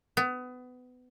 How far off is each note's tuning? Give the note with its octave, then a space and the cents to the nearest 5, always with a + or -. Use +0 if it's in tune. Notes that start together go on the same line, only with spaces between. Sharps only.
B3 +25